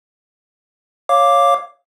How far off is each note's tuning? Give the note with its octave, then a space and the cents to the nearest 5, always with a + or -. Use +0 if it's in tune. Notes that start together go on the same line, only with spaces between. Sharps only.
C#5 +0 F5 +0 D6 +0